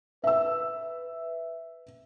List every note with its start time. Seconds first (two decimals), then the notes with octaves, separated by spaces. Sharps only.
0.24 B4 E5 E6